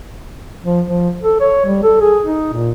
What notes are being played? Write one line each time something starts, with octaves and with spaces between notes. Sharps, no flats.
F3
F3
A4
C#5
G3
A4
G#4
D#4
A#2